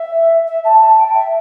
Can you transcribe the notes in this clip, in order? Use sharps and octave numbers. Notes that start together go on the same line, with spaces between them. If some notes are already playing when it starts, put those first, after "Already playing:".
Already playing: E5
E5
A5
A5
G5
E5